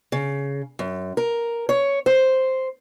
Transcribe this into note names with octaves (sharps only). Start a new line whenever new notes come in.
C#3
F#2
A#4
C#5
C5